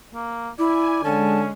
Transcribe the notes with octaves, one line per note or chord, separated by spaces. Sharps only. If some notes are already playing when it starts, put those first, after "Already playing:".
A#3
E4 D5 G#5
D3 G#3 C#4 A5